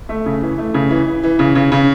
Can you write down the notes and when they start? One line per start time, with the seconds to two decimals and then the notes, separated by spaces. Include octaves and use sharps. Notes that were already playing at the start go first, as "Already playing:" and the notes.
0.09 A3
0.26 C#3
0.42 E3
0.58 A3
0.74 C#3
0.90 E3
1.07 E3
1.23 E3
1.39 C#3
1.55 C#3
1.72 C#3